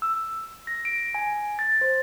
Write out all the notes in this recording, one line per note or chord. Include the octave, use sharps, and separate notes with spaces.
E6
A#6
D7
G#5
A6
C5